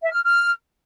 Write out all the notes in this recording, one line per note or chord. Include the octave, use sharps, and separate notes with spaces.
E5
F6
F6